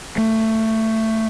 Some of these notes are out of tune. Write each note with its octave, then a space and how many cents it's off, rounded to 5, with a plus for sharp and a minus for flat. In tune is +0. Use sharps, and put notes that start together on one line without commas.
A3 +15